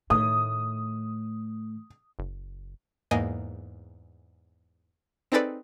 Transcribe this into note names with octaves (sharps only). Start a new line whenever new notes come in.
A2 D#3 D#6
F#1
E2 G#2 A#3 D#5 G#5
C4 D#4 G#4 A4 B4 D5